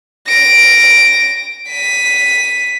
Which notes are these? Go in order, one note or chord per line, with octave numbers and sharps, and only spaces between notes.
A#6 D7
B6 D#7